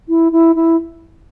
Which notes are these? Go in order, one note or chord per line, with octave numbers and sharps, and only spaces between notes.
E4
E4
E4